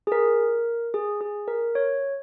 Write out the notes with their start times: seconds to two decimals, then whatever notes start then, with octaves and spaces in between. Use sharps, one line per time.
0.07 G#4
0.12 A#4
0.94 G#4
1.21 G#4
1.48 A#4
1.75 C#5